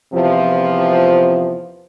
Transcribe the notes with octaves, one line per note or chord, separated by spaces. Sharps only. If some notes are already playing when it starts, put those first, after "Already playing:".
E2 C3 F3